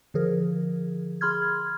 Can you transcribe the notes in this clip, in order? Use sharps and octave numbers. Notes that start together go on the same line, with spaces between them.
D3 F3 G#4 A#4
G#4 B5 C6 F6 G#6